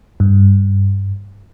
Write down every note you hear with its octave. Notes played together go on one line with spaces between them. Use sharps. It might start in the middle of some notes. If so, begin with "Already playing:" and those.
G2